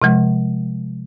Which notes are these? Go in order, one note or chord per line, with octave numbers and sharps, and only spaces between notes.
C3 F3 G#3